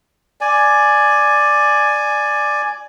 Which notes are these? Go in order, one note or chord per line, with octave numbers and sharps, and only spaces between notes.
D5 G#5